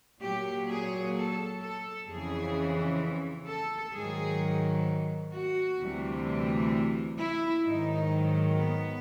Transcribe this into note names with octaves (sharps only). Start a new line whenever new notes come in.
A#2 F#3 G4
G#4
A4
A4
F2 C#3 E3 G#4
A4
G#2 D#3 F#3 G#4
F#4
D2 C3 E3 G3
E4
G#2 D#3 F#3 D#4
B3